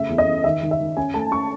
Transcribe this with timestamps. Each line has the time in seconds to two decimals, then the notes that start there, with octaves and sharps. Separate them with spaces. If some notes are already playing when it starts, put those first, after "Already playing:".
Already playing: C#3 A3 E5
0.09 E2
0.18 D#5
0.26 E2
0.44 D#3 E5
0.62 D#3
0.71 E5
0.80 D#3
0.97 C#4 G#5
1.14 A3 A5
1.32 C#4 C#6